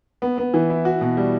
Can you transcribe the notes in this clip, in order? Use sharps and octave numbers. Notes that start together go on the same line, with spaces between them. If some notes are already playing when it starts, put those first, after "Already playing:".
B3
B3
E3
E4
F#4
B2
G3